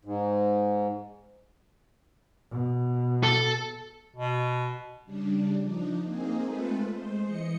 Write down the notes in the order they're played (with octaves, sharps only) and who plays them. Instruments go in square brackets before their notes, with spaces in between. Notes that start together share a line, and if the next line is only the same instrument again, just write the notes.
[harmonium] G#2
[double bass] B2
[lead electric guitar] A4
[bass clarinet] B2
[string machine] C#3 G3 D4
F3 D4 D#4
A#3 C4 D#4 G#4
G#3 A3 C4 F4 A4 B4
G#3 C5
E3 D#5 C#7